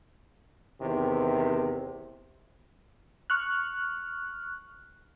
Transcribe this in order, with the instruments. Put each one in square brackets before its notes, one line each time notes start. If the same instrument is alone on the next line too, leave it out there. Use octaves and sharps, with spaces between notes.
[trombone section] E2 C3 D#3
[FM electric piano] C#6 F6 F#6